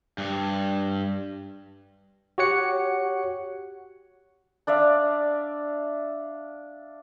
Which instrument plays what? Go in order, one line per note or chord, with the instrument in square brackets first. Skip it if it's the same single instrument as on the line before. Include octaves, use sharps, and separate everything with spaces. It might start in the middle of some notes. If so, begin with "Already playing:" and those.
[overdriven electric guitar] G2
[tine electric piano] F#4 G4 C#5 F#5 C#7
[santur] D4 D5 E5 F5